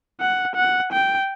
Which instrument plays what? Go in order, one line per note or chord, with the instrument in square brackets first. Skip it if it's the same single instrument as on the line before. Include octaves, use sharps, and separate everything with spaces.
[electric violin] F#5
F#5
G5